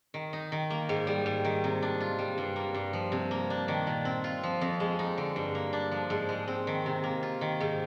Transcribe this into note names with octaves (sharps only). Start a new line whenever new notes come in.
D#3
D#4
D#3
A#3
G#2
G3
G#2
D#3
C3
D4
F4
G3
G2
A#3
G2
F3
C3
A#3
D4
D#3
A#2
C4
F4
F3
F2
G#3
D#4
D3
G2
A#3
D4
F3
G#2
G#3
C4
D#3
C3
A#3
F4
D#3
G#2